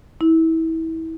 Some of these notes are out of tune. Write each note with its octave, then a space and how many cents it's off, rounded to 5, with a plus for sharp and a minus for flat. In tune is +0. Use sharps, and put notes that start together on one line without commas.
E4 -30